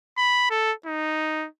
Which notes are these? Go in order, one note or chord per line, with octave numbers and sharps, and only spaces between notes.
B5
A4
D#4